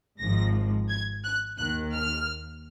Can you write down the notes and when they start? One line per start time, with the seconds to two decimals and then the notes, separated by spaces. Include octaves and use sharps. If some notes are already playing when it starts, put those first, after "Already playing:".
0.19 G#1 G#2 F3 A#6
0.89 G#6
1.24 F#6
1.58 D#2 D#3 F#6
1.94 F6